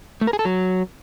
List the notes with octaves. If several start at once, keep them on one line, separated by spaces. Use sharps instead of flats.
A3
A#4
G#4
A4
F#3